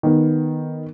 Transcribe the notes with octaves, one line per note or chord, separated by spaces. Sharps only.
D#3 B3